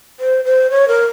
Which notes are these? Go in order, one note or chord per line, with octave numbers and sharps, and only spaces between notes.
C5
C5
C#5
A#4